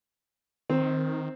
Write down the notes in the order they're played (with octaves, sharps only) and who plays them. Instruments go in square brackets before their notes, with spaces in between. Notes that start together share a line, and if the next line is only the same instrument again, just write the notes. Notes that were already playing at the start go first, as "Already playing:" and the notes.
[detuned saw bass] D#3 [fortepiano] C4